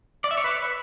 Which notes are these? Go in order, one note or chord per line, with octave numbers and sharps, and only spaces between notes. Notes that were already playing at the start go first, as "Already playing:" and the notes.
D5
E5
C#5
B4